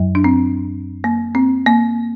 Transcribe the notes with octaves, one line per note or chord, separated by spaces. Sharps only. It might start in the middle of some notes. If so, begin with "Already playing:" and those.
Already playing: F#2 F#3
D4
C4
A#3
C4
A#3